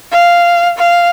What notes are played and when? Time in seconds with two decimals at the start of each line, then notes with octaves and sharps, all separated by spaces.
0.12 F5
0.78 F5